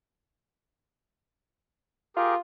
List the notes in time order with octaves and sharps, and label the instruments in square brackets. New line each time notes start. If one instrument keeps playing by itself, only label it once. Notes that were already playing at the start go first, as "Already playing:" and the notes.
[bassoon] F4 [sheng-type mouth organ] G4 G#4 A#4